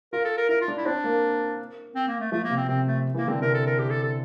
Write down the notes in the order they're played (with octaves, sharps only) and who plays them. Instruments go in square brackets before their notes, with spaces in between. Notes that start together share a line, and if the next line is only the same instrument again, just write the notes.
[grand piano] F4 [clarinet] A#4
[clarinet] A4
A#4
[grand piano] E4 [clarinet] A#4
[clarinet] F4
[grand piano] D4
[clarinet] E4
[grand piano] C4 [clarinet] D4
[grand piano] A#3
[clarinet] C4
A#3
A3
[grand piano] F3 [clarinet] A3
[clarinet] A#3
[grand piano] C3
[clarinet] C4
[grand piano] C3 [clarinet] C4
[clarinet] A3
[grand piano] E3 [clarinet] A#3
[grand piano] D3 [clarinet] C4
[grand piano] C3 [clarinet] A#4
[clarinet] A4
A#4
G4
A4
A4